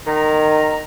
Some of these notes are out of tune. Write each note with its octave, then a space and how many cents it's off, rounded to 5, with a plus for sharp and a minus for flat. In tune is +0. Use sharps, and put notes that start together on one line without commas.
D#3 -20 A#5 +0